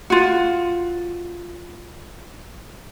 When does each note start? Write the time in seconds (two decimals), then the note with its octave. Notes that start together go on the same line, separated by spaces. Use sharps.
0.10 F4 F#4